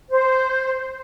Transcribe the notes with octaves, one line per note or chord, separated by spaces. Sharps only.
C5